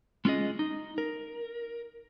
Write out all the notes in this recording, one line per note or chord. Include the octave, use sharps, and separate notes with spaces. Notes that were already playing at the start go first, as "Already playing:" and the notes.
G#3 C#4 F4 G#4 D#5
D#4
A#4